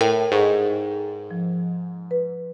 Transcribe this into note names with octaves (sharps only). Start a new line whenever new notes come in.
A2 A#4 G5
G#2 G#4 A4 C#6
F3
B4